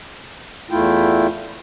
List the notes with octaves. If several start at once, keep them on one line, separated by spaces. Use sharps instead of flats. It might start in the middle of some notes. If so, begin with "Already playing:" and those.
E2 A3 E4 F4 G5